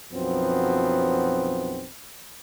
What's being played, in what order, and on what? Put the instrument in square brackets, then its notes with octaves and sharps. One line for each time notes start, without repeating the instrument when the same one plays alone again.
[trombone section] B1 F#2 F3 B3 C4